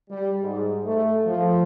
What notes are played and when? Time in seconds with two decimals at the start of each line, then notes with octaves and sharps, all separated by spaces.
0.10 G3
0.41 G#2
0.85 A3
1.25 F3